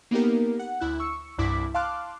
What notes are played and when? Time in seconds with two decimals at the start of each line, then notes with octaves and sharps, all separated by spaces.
0.11 A#3 B3 D#4 G4 A#4
0.59 F#5
0.80 D2 E4 F#6
1.00 C#6 E6 C#7
1.38 C2 G2 E4 D6 B6
1.74 F5 A5 C6 D6 F6 F#6